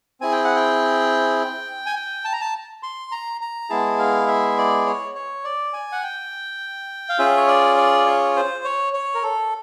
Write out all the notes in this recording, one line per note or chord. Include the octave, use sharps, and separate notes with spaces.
C4 E4 G#4 G#5
G5
F#5
G5
G#5
G5
A5
A#5
A5
C6
A#5
A#5
G#3 B3 E4 G#4 A5
F5
E5
D5
C#5
C#5
D5
G#5
F#5
G5
F5
C#4 F4 G#4 E5
C#5
D5
D5
C#5
C5
C#5
C#5
A#4
A4